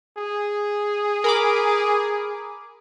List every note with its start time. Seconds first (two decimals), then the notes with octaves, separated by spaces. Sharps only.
0.17 G#4
1.24 A#4 B5 D6